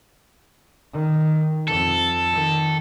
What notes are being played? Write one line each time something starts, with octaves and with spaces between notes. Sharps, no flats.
D#3
F2 A4
D#3